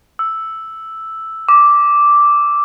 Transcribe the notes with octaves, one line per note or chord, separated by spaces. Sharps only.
E6
D6